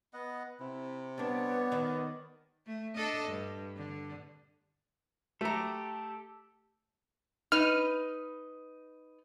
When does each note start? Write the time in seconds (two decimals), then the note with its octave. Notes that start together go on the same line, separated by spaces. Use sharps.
0.13 B3 D#5 F#5
0.60 C3 E4
1.18 G3 B3 D4 G4 C#5 D5
1.72 D#3
2.66 A3
2.95 D4 A4 D#5
3.28 G2
3.77 D3
5.41 A3 G4 A4 F#5 A#5
7.52 D#4 B4 F6